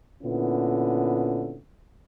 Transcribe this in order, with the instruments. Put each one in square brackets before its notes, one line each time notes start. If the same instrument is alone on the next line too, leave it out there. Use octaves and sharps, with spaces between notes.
[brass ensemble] A#2 D3 B3 C#4 E4